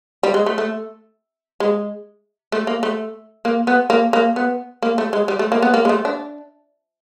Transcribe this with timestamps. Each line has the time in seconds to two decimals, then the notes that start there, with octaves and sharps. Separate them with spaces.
0.23 G3
0.34 G#3
0.46 A3
0.58 A3
1.60 G#3
2.52 A3
2.67 A#3
2.83 A3
3.45 A#3
3.67 B3
3.90 A#3
4.13 A#3
4.36 B3
4.82 A#3
4.98 A3
5.13 G#3
5.28 G3
5.39 A3
5.52 A#3
5.62 B3
5.74 A#3
5.85 G#3
5.89 A3
6.05 D4